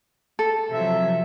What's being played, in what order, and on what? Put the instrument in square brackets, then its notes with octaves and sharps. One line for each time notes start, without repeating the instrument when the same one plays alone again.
[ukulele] A4
[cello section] C3 F3 F#3 [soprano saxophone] E5